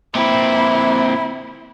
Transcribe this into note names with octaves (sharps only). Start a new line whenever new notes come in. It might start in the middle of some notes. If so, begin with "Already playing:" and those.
A#2 C4 E4